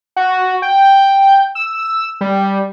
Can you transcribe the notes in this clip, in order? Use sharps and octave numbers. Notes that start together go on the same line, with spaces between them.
F#4
G5
E6
G3